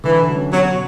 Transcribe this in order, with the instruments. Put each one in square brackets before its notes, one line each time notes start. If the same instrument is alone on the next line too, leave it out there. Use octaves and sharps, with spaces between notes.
[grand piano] D3 [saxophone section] E3
[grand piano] F#3 C#4
[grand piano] B2 [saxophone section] F#3